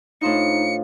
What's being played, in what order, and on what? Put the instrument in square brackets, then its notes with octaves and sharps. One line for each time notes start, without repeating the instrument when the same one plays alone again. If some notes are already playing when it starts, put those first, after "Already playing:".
[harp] A2 C5 D#5 [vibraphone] D4 F4 F5 [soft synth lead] D#4 [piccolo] C#7